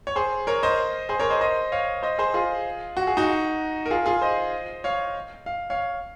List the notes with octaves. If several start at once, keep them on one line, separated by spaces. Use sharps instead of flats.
C#5
G#4 C5
A#4 C#5
C5 D#5
G#4 C5
A#4 C#5
C5 D#5
C5 D#5
C#5 F5
C5 D#5
G#4 C5
F4 G#4
F#4
G#4
D#4 F#4
A#4
F4 G#4
F4 G#4
C5 D#5
C#5 F5
F5
C#5 F5